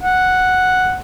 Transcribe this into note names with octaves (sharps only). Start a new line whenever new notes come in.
F#5